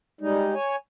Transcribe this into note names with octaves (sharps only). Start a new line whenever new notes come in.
G3 G#3 D#4
C#5 G#5